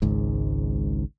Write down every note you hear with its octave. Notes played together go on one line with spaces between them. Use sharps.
G#1 C#2 G#2